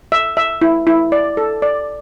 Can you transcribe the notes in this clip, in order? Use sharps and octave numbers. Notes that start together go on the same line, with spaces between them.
E5
E5
E4
E4
D5
A4
D5